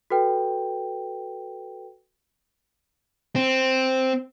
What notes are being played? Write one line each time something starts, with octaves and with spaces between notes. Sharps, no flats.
F#4 A4 B4 G5
C4